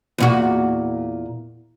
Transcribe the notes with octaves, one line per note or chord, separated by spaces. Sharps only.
E2 A#2 F#4